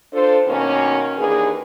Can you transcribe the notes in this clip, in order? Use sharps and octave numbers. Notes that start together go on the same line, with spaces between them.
D4 F4 A4 C5
B2 D#3 A#3 C#4
D#2 E3 A#3 D4 G#4 B4